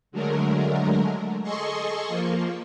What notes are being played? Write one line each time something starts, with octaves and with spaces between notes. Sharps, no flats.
D3 F#3 G#3 A3 A#4
G#4 A4 D#5 C6 C#6
F3 A#3